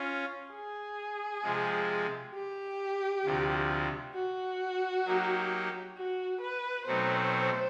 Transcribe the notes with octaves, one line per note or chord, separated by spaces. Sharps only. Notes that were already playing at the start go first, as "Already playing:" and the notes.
Already playing: C#4 F4
G#4
C3 F3 G#3
G4
D2 C3 F3
F#4
F#3 A#3 D#4 G4
F#4
B4
B2 F#3 A3 C4 D#4 C5